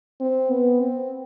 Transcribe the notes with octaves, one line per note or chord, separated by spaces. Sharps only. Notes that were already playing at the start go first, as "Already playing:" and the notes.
C4
B3
C4